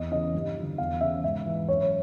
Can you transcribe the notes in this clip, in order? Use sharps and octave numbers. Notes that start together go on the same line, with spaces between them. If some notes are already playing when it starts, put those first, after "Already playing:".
Already playing: E2 D#5
C#3 E3 D#5
G2
D3 F3
E2 F5
C#3 E3 E5
G#2 E5
E3
F#2 C#5